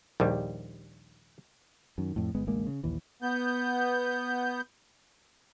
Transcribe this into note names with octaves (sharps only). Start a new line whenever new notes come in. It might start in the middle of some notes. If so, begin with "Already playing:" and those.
A#1 D#2 G3
F#2 D#3
F2 A2
G1 G#3 B3
A1 D2 G#3 A#3
C#3
A#1 D#2 E3
B3 G6